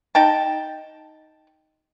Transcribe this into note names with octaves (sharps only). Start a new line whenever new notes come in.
D#4 G5 A5